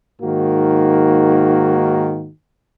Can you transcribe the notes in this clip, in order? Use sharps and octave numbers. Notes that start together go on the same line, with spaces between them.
G#2 D#3 A#3 F#4